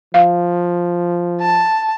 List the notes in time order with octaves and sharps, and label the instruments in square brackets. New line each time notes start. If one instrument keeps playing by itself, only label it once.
[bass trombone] F3 [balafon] F5
[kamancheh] A5